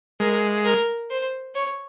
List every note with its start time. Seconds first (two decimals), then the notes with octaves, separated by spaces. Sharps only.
0.20 G#3 A#4
0.65 A#4
1.10 C5
1.55 C#5